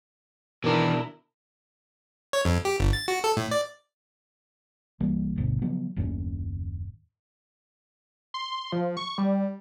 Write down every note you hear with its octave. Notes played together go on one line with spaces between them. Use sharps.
B2 D#3 E3 D4 E4 A#4
C#5
F2
G4
G1
A6
F#4
A4
A2
D5
C2 E3 G3 A#3
G1 D2 B2
C#3 F3 F#3 B3
F#1 D#2 A2 C#4
C6
F3
C#6
G3